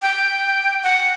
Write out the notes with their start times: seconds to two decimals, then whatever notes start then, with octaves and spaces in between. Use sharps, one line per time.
0.02 G5
0.83 F#5